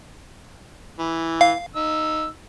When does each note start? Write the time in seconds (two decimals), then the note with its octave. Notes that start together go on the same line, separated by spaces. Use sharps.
0.99 E3
1.41 F5
1.76 D#4 E6